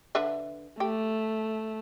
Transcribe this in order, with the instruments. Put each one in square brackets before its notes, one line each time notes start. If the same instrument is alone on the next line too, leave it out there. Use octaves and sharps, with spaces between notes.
[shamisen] D3 B4 E5
[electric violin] A3 [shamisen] G4